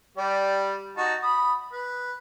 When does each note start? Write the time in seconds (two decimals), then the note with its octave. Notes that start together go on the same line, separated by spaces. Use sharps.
0.17 G3 G4 D5
0.97 D#4 F#4 A5
1.23 B5 D#6
1.72 B4